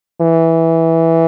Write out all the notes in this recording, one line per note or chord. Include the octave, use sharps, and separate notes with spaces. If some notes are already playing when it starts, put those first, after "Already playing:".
E3